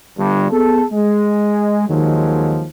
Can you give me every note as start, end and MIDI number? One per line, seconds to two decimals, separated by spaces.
0.17 0.47 31
0.17 0.47 43
0.52 0.84 59
0.52 0.84 68
0.52 0.84 69
0.91 1.88 56
1.89 2.66 39
1.89 2.66 51
1.89 2.66 53
1.89 2.66 54
1.89 2.66 56